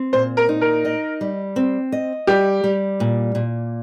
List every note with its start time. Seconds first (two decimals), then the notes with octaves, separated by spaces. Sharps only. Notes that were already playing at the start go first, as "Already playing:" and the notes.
Already playing: C4
0.13 A#2 C5
0.37 A#4
0.49 D#4
0.61 A#4
0.85 D#5
1.21 G3
1.56 C4
1.92 D#5
2.27 G3 G4
2.64 G3
3.00 A#2
3.35 A#2